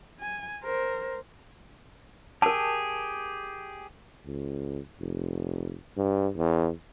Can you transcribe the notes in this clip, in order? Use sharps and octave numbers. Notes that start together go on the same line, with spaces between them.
G#5
A#4 C5
G4 G#4 A#4 A5
C#2
F1
G2
E2